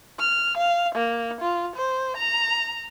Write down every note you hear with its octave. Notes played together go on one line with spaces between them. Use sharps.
F6
F5
A#3
F4
C5
A#5